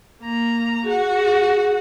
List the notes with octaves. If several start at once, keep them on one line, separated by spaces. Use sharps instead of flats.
A#3 A#5
F#4 G#4 F#5